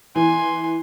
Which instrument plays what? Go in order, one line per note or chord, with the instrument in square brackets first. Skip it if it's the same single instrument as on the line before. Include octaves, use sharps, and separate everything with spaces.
[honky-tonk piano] E3 [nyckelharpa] G#5 C6